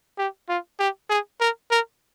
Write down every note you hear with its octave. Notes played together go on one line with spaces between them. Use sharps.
G4
F4
G4
G#4
A#4
A#4